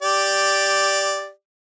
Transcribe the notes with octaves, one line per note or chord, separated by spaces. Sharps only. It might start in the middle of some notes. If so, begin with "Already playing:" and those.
G4 D5